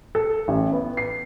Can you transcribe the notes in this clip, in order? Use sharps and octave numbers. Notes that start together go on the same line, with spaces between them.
A4
A1
B3
C7